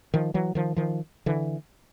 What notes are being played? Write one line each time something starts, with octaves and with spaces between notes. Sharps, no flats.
D#3 F3
E3 F#3
D#3 F3
D#3 F3
D3 E3